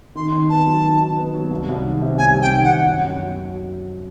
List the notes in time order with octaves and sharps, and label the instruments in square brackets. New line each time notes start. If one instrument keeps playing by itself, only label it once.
[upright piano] D#3 [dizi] C6
[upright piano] D#3
[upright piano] B3 [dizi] A5
[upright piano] F#3
D#3
D#3
B3
F#3
C2
C2
D#3
C3
[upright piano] C2 [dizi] G#5
[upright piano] C2
[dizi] G5
[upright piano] D#3
[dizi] F#5
[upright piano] C3
F#2
F#2
F#3